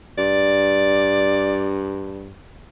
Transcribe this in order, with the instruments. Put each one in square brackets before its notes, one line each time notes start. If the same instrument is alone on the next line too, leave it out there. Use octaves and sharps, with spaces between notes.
[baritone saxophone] G2 [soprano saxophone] D5